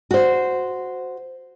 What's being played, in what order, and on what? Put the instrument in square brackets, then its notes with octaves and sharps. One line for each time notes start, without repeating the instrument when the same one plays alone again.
[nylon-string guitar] F#4 C5